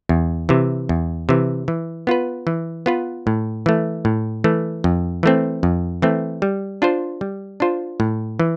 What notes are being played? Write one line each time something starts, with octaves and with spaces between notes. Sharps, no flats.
E2
C3 E3
E2
C3 E3
E3
B3 F4 B4
E3
B3 F4 B4
A2
E3 A3
A2
E3 A3
F2
E3 A3 C4
F2
E3 A3 C4
G3
D4 F4 C5
G3
D4 F4 C5
A2
E3